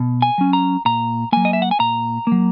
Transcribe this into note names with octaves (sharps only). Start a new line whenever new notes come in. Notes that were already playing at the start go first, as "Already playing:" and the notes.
Already playing: B2
G#5
F#3 C#4
A#5
A#2 A#5
F#3 A#3 G#5
D#5
E5
F#5
G#5
A#2 A#5
F#3 A#3